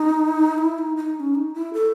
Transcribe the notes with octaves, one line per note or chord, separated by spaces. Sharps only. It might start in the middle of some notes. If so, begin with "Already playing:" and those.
Already playing: D#4
E4
D#4
D#4
D#4
C#4
D#4
E4
A4